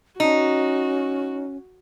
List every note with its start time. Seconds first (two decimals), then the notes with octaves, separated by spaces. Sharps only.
0.20 C#4 D#4 F#4